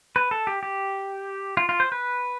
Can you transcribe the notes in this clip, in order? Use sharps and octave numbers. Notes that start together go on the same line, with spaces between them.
B4
A4
G4
G4
F4
F4
C5
B4